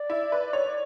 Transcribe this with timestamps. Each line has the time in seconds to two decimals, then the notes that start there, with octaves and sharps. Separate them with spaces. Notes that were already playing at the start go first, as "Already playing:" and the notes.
Already playing: D5
0.10 E4
0.32 B4
0.53 C#5